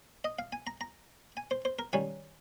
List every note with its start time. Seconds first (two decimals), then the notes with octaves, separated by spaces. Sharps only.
0.24 D#5
0.39 F5
0.53 G#5
0.67 A#5
0.81 A#5
1.37 G#5
1.51 C5
1.65 C5
1.79 A#4
1.93 D#3 G3 C#4 G#5